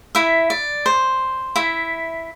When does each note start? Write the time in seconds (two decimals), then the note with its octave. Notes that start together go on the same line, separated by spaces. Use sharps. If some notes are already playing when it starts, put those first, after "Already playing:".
0.15 E4 E5
0.50 D5
0.86 C5
1.56 E4 E5